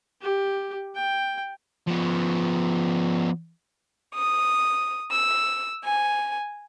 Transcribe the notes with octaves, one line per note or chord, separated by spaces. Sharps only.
G4
G5
F3 B3
D#6
E6
G#5